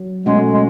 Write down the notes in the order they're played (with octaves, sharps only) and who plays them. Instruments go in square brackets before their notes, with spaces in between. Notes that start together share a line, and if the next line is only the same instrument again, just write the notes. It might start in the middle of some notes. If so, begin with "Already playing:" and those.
Already playing: [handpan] F#3
[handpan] B2 A3 C#4 F#4 [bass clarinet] G#3
[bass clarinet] G#3